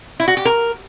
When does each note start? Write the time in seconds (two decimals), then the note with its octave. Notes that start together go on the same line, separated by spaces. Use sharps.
0.20 E4
0.28 F#4
0.37 G4
0.45 A#4